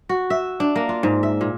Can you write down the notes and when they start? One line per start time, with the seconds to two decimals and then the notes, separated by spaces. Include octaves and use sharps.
0.09 F#4
0.30 E5
0.60 D4
0.76 A#3
0.89 F4
1.03 G#2
1.23 E5
1.41 A#2